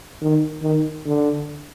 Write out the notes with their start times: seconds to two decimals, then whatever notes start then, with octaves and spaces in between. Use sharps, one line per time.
0.21 D#3
0.62 D#3
1.05 D3